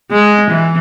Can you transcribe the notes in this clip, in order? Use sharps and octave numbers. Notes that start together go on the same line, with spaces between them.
G#3
E3